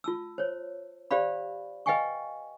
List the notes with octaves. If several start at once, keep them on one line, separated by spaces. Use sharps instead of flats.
F4 A5 E6
C5 C#5
G4 C5 D5 F5 B5
B4 D#5 F5 G5 G#5 C#6